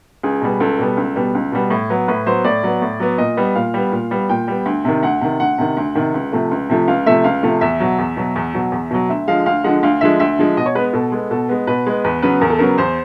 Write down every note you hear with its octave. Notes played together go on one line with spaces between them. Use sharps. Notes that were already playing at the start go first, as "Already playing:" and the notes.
C#2 G#4
B2 G3 B3
C#2 A4
B2 G3 B3
C#2
B2 G3 B3
C#2
B2 G3 B3
A2
F#3 B3
A2 B4
F#3 B3 C5
A2 D5
F#3 B3
A2
F#3 B3
A#2 D#5
G3 B3
A#2 F5
G3 B3
A#2
G3 B3
A#2 G5
G3 B3
D2
C3 D#3
D2 F#5
C3 D#3
D2 F#5
C3 D#3
D2
C3 D#3
C#2
C3 F3 A3
C#2
C3 F3 A3
C#2 F5
C3 F3 A3 E5
C#2 F5
C3 F3 A3
E2 E5
B2 F#3
E2
B2 F#3
E2
B2 F#3
E2
B2 F#3
D2 E5
D3 F3 G#3 F5
D2 F5
D3 F3 G#3 F#5
D2 F5
D3 F3 G#3 E5
D2 E5
D3 F3 G#3
B2 D#5
C#5
G#3 B3 B4
B2 A4
G#3 B3
B2 A4
G#3 B3
B2 B4
G#3 B3
E2 B4
C#3 F#3 B3 B4
E2 A#4
A4
C#3 F#3 B3 A#4
E2 C5